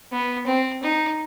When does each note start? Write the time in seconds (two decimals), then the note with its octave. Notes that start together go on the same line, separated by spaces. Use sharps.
0.12 B3
0.47 C4
0.83 D#4